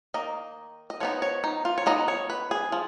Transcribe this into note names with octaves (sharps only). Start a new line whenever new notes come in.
D#3 A#3 D#5
D#5
F3 B3 D#4 C#5
C#5
D#4
F4
C#5
F3 B3 D#4 D#5
C#5
B4
G#4
F3